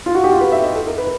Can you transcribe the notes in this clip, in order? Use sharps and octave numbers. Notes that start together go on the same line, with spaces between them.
F4
F#4
G4
F4
B4
E5
D#5
A4
A#4
B4